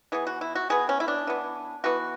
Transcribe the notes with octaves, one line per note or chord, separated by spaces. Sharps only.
E3 B3 G#4
F#4
E4
F#4
E3 B3 G#4
C#4
E4
D4
E3 B3
E3 B3 F#4